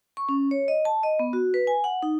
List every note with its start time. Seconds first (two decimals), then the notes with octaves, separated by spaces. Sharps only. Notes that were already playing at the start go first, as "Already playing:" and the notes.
0.17 C#6
0.29 C#4
0.51 C#5
0.68 D#5
0.85 A5
1.03 D#5
1.19 B3
1.33 F#4
1.54 B4
1.67 G#5
1.84 F#5
2.03 D#4